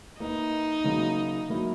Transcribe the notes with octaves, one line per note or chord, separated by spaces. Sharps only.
A#3 D#4 E4 B4 D#5
C#3 F#3 A#3 E4
F#3 A#3 E4